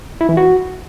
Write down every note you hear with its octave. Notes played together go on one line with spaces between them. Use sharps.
E4
E3
F#4